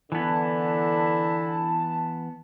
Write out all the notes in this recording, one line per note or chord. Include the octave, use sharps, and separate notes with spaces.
D3 E3 B3 E4 A5